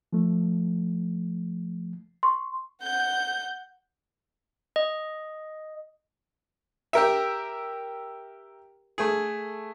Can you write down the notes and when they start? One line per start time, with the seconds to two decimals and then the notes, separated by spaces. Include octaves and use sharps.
0.13 F3 A3
2.23 C6 C#6
2.83 F#5 G6
4.76 D#5
6.93 G4 A#4 E5
8.98 A3 G#4